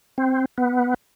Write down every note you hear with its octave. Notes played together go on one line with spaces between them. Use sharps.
C4
B3